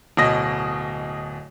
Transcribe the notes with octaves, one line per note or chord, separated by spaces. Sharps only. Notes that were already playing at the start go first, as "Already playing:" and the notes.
D1 B2 D#5 A#6